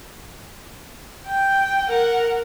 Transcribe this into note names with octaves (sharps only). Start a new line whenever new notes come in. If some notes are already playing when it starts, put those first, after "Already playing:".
G5
A#4 F#5